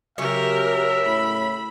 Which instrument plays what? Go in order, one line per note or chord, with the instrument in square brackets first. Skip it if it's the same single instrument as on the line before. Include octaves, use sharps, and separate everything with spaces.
[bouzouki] C#3 C#5 [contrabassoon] F#3 [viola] G4 A#4 [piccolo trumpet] E5
[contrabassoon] A2 [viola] B5